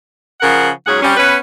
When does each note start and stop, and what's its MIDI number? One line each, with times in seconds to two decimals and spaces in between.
0.41 0.68 49
0.41 0.68 53
0.41 0.68 70
0.41 0.68 78
0.87 0.98 44
0.87 0.98 54
0.87 0.98 61
0.87 0.98 68
0.87 0.98 78
1.02 1.14 55
1.02 1.14 60
1.02 1.14 61
1.17 1.35 59
1.17 1.35 61
1.17 1.35 71